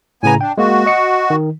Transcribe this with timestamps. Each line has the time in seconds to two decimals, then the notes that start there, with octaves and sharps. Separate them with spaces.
0.23 A2 C#3 B3 G#5 A#5
0.41 D4 G5
0.58 G#3 A#3 F#4
0.86 D#5 C#7
1.30 D#3